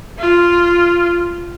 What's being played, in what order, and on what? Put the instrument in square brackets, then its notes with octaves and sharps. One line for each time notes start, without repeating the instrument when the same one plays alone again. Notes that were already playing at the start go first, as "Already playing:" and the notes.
[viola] F4